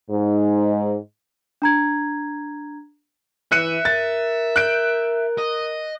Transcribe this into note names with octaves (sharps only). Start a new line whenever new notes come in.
G#2
D4 A#5 G#6
E3 E5 F#6 C#7 D#7
A#4 A6
F#6 G6 D7
D#5